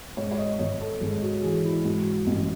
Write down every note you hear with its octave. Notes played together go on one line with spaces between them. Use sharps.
G#2 C#5
C#5
D#5
G#1 C#5
A4
G#1 G#4
F#4
E3 G#4
E4
G#2 F#4
A1